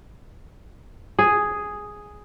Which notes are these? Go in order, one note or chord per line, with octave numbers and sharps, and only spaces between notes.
G#4